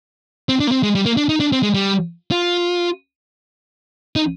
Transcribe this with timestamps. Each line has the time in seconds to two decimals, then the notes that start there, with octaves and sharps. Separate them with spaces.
0.49 C4
0.60 D4
0.67 A#3
0.71 C4
0.83 G#3
0.95 G3
1.06 A#3
1.17 D4
1.29 D#4
1.40 D4
1.52 C4
1.63 G#3
1.74 G3
2.32 F4
4.16 D#4